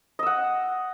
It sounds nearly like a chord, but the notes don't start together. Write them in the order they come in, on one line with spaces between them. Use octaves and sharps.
D#5 E6 F#5